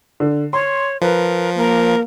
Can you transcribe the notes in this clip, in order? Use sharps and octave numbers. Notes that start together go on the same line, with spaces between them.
D3
C#5 C6
F3 A#4 B4
A#3 A#4